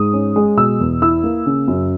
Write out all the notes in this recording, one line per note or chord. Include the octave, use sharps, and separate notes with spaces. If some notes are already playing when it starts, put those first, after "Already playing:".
Already playing: G#2 D#6
C#4
G#3
B2 E6
E2
E4 E6
A#3
C#3
F#2